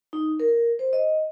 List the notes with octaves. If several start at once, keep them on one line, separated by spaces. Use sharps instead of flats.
D#4
A#4
C5
D#5